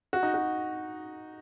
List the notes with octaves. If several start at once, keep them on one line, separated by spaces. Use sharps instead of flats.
F#4
D#4
F#4